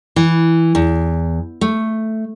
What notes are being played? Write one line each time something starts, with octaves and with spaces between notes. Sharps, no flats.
E3
E2
A3